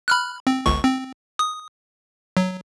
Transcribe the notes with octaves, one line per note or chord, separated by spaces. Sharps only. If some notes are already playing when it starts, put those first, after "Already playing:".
B5 F6 F#6
C4
G1 C#2 C#6
C4
D#6
F#3